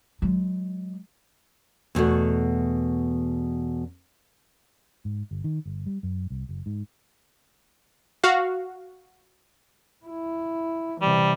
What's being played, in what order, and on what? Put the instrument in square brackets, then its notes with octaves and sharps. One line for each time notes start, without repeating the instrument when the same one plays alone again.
[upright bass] F#3 G#3
[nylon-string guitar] E2 B2 A3 F#4
[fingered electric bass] G#2
G1
D#3
G1
G3
F#2
C2
F#1
G#2
[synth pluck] F#4 F5
[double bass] E4
[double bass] C3 E3 [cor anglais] G3